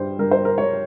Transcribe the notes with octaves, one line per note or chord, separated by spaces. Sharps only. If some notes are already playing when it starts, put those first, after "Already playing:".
Already playing: G2 G3 C5
G2 A#4
C5
A#4
G3 C#5